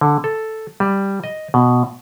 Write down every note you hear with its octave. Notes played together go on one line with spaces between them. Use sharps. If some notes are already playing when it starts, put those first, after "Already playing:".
D3
A4
G3
D#5
B2